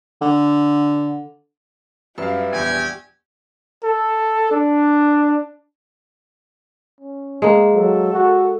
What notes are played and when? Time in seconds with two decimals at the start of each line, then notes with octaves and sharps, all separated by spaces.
0.21 D3
2.18 F#2 G3 B4 E5 F5 B5
2.53 A#1 E2 G4 G5 G#5
3.84 A4
4.51 D4
7.00 C#4
7.42 G#3 A#3
7.74 F#3 A4
8.13 F#4